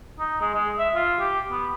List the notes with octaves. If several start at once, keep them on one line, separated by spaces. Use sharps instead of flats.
D#4
G#3
G#3
E5
F4
G4
B3